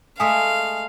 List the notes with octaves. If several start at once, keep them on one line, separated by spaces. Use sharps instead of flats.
G#3 A3 E5 F5 G#5 D#6